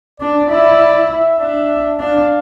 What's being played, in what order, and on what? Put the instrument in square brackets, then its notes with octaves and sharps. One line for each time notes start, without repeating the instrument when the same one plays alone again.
[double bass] D4 [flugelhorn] D5
[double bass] E4 [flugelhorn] D5
[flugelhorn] E5
[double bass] D4 [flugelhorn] E5
[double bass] D4 [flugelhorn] F5